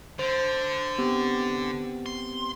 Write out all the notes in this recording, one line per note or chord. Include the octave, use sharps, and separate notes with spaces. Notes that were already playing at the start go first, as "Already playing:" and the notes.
D3 C5
B3 C4 G4
C6